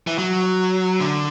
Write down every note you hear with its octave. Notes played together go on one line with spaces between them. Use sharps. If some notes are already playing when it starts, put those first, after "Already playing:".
E3
F#3
D3